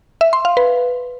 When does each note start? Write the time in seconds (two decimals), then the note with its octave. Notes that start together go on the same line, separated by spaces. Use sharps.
0.21 E5
0.33 C6
0.45 F5
0.57 B4